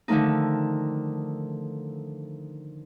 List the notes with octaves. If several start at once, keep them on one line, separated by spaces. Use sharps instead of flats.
D3 D#3 F3 A3 D#4